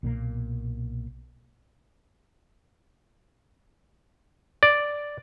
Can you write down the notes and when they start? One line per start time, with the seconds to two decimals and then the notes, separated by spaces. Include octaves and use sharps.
0.03 B1 A#2 D#3 A#3
4.63 D5